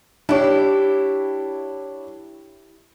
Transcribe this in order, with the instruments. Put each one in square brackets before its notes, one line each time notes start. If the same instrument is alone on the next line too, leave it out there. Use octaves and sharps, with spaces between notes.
[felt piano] D4 C#5 [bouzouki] E4 G4